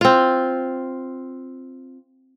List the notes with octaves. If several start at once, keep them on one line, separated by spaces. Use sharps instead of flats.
C4 F4